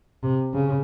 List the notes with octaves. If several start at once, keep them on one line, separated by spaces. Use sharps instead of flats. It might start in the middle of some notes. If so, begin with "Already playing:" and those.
C3
C#3